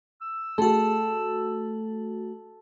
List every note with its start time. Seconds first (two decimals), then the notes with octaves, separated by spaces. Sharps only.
0.21 E6
0.58 A3 F#4 A4